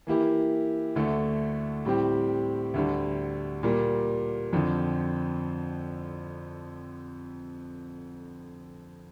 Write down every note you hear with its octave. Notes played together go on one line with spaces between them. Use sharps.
E3 A#3 E4 G4
D2 D3 A3
A2 G3 C4 G4
D2 D3 G3
A#2 G3 A#3
F2 D3 F3 C4